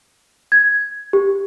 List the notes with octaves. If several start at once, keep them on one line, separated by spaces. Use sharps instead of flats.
G#6
G4